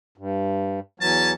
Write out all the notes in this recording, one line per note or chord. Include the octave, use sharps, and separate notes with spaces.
G2
E2 E3 F#3 C#4 G#5 A5